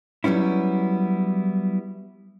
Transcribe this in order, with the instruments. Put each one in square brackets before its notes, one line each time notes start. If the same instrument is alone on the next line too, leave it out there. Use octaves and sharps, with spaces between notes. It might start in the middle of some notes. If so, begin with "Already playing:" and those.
[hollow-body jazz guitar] F#3 G3 B3 C#4 E4